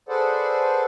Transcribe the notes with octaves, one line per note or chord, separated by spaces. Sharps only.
G#4 A4 B4 C5 D5 F#5